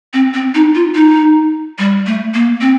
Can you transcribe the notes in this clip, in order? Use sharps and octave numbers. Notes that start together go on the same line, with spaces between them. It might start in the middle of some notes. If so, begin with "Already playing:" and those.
C4
C4
D#4
F4
D#4
G3
A3
A#3
C4